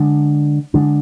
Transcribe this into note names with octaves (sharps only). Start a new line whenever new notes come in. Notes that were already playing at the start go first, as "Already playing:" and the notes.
Already playing: D3 G#3 D4
D3 G#3 D4